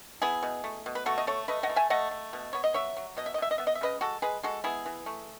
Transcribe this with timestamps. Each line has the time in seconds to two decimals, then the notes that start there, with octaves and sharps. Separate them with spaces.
0.22 B3 E4 G#4
0.43 B2
0.64 A3
0.86 B2
0.95 B4
1.06 A3 F#4 A4
1.18 D#5
1.27 A3 A4 C#5
1.48 A3 B4 D#5
1.63 D#5 F#5
1.70 E3
1.76 E5 G#5
1.90 A3 D#5 F#5
2.11 A3
2.33 B2
2.53 B3 C#5
2.64 D#5
2.74 F#3 C#5 E5
2.97 F#3
3.17 B2 D#5
3.26 E5
3.34 D#5
3.38 B2 E5
3.51 D#5
3.58 B3 E5
3.67 D#5
3.75 E5
3.81 C#3 B4 D#5
4.01 G#3 F#4 A4
4.22 G#3 G#4 B4
4.43 G#3 F#4 A4
4.64 B3 E4 G#4
4.86 E3
5.06 A3